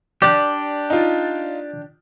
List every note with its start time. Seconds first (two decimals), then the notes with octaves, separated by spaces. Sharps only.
0.22 D4 G4 D5
0.90 D#4 F4